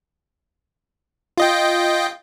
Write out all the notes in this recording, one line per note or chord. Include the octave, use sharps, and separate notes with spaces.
F4 D#5 G5